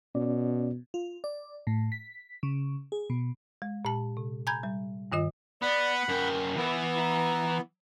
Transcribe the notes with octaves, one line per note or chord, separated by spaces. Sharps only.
B2 C#4 D5
F4
D5
A2
B6
C#3
G#4
B2
G#3
A#2 A5
C3
G#5 A#5 B5 G6 G#6
G3
G2 D#3 F4 D#5
B3 D5 F#5 B5
F#2 A#4 G5
E3 B3 E4
A#5